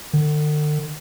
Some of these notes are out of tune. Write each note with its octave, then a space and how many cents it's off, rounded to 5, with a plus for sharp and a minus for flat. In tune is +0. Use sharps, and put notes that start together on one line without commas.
D3 +40